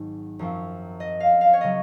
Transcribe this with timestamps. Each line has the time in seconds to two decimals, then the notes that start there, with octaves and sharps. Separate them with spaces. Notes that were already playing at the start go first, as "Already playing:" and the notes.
Already playing: G#1 G#2 F#3
0.39 F#2 F3 C4
1.00 D#5
1.20 F5
1.41 F5
1.53 C#5
1.61 C#3 F#3 D#5